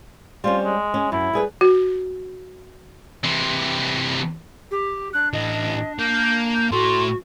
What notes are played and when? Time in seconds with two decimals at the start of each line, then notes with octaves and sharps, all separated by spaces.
0.44 G3 C4 C#4 F4
0.65 G#3
0.94 C#4
1.12 F#2 E4
1.33 G3 G#4 B4
1.61 F#4
3.24 C3 E3
4.71 G4
5.14 D4 F#6
5.33 A2 E3 D#5
5.99 A#3 G6
6.55 G6
6.72 A2 A3 F#4 C6